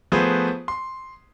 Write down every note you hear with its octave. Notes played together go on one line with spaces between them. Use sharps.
F3 A3 B3 G#4 B4 C5
C6